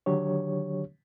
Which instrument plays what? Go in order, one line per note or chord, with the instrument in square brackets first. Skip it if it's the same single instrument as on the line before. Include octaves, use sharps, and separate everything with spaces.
[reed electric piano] D3 D#3 F#3 D4 G4 C#5